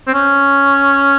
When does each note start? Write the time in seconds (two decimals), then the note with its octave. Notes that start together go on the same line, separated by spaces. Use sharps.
0.07 C4
0.14 C#4